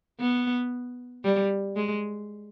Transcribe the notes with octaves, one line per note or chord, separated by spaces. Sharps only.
B3
G3
G#3